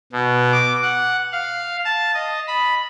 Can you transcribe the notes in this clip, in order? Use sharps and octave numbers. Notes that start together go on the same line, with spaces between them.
B2
D6
F#5
F5
A5
D#5
B5